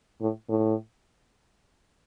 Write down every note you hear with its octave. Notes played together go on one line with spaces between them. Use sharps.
A2
A2